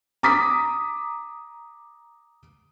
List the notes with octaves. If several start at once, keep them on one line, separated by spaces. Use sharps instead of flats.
A#5 D6 D#6 B6